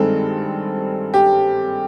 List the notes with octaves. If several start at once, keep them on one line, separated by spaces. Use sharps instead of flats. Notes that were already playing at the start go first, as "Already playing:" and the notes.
Already playing: G2 D#3 G#3 C4 A4
G4